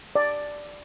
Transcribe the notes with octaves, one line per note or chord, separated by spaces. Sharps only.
D5